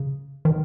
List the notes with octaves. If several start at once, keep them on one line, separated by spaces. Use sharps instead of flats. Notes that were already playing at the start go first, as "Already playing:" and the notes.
Already playing: C#3
D#3